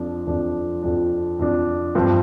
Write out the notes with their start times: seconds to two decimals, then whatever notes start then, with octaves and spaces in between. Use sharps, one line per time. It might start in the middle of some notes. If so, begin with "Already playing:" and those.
Already playing: F2 F3 D4
0.27 F2 F3 D4
0.82 F2 F3 D4
1.39 F2 F3 D4
1.95 G2 F3 C4